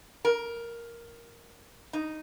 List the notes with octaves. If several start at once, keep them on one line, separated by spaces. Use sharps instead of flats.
A#4
D#4